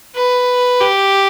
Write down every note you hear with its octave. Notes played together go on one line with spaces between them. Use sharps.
B4
G4